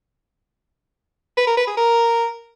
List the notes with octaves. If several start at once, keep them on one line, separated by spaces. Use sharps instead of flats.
B4
A#4
B4
G#4
A#4